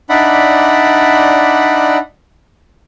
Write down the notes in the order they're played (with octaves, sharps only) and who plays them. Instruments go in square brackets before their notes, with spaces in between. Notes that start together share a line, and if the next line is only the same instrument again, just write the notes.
[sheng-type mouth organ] D4 D#4 D5 E5 F#5 B5